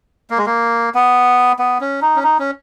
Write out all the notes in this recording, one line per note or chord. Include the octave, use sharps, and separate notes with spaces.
A#3
G#3
A#3
B3
B3
C#4
D#4
C#4
D#4
C#4